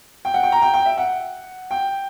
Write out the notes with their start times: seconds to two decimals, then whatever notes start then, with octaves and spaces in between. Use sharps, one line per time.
0.25 G5
0.34 F#5
0.43 G5
0.52 A#5
0.62 G5
0.74 G5
0.86 E5
0.98 F#5
1.71 G5